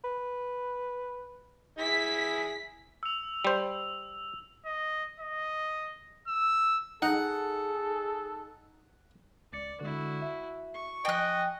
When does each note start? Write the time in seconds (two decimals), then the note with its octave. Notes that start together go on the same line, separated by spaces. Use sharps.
0.04 B4
1.78 E4 G#4 B6
3.03 E6 F7
3.45 G3 C5
4.66 D#5
5.20 D#5
6.28 E6
7.02 D#4 G#4 A4 F#5
9.53 C#2 D5 A6 C#7
9.81 D3 G#3 E4 F#4
10.22 E5
10.74 C#6
11.05 F3 D#5 G5 G#5 F#6